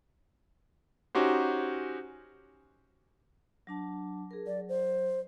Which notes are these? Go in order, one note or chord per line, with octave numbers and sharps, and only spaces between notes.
C#4 D#4 F#4 G4 C5
F#3 D4 A5
G#4 A#4
F#3 D5
C5